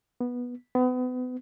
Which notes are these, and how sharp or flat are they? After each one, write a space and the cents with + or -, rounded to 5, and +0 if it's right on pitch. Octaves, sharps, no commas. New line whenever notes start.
B3 -10
B3 +35